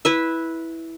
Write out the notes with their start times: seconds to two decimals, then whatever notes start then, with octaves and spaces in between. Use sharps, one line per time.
0.05 E4 B4 E5